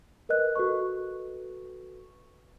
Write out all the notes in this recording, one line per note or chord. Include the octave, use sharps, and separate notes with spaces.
A#4 B4 D#5 F#6
F#4 A4 B4 C#6